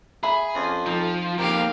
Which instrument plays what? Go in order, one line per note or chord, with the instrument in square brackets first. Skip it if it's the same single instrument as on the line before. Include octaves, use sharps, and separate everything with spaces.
[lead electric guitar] G#4 [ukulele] E5 B5
[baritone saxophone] F2 [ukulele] C#4
[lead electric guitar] F3 [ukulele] D#4 A4
[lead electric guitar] F2 A#3 [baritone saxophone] D#3 [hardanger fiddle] G4 F5